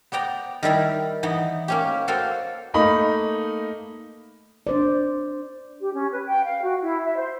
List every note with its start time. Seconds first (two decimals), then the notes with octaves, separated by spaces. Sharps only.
0.12 B3 D5 G5 A#5
0.63 D#3 G3 E4 A#4
1.23 E3 B3 D#4
1.68 A#3 C#4 G4
2.08 A#3 F#4 A4 C5 F5 G5
2.74 A3 A#3 D#4 D#5 B5
4.67 D4 C5 D5
5.80 G4
5.93 C#4
6.11 B4
6.26 G5
6.44 F5
6.63 F#4
6.80 E4
7.04 E5
7.16 C5